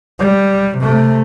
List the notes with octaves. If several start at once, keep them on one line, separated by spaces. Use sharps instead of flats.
G3
C3 A3